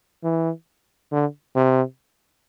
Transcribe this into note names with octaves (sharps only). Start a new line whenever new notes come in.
E3
D3
C3